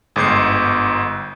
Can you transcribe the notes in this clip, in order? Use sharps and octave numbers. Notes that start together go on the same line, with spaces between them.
G1 G#2 G6 C7